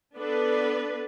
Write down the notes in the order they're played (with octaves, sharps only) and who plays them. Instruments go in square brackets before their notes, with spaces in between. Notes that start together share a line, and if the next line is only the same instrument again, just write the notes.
[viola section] B3 D4 A4 B4